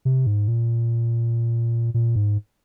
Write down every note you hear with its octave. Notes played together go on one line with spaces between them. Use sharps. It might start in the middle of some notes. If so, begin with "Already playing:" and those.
C3
G#2
A#2
A#2
G#2